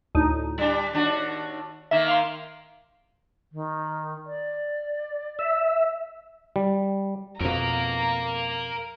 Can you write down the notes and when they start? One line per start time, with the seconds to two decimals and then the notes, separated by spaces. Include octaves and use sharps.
0.15 D2 A2 D#4
0.58 G3 D4
0.93 D#2 D4 F#4
1.91 D#3 A#3 E5
2.08 F5 C6
3.52 D#3
4.26 D5
5.39 E5
6.56 G3
7.41 F2 B2 A#4 F5 A#5